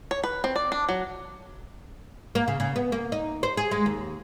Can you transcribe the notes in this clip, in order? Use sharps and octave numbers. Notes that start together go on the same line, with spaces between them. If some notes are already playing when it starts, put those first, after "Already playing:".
C#5
B4
C4
D5
D4
F#3
A#3
C#3
C#3
B3
A#3
D#4
C5
G#4
G#3
D#2